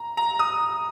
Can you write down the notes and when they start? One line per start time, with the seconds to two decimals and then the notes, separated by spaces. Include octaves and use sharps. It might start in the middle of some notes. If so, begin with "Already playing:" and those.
Already playing: A#5
0.17 A#5
0.39 D#6